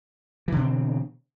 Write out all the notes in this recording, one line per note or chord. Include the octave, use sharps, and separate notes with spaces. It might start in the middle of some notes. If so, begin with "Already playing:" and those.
B2 D3 E3 C4